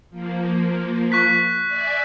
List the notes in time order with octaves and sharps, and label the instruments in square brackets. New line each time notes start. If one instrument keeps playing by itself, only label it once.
[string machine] F3 A#3
[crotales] C#6 F#6 B6
[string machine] D5 E5 G#5